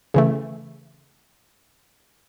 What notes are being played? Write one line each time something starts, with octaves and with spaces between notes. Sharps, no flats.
C#3 E3 A3